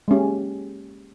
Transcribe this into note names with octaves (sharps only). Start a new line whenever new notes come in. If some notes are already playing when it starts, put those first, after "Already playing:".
G#3 A#3 C#4 G4